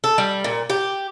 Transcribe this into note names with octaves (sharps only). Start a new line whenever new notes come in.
A4
G3
A#2
G4